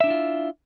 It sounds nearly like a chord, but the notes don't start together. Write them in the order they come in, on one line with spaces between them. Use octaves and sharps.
E5 D4 E4 F4